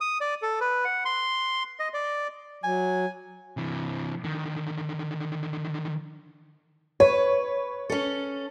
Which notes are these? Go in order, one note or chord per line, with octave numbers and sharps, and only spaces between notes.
D#6
D5
A4
B4
F#5
C6
D#5
D5
F#3 G#5
C3 E3
D3 D#3
B4 C#5
C#4 A4